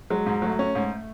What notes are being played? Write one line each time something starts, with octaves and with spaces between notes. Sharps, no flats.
F#3 G#3
G#2
F#3 A3
C#4
G#2